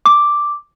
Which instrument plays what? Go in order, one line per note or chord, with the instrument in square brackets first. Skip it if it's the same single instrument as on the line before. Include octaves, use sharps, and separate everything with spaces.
[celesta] D6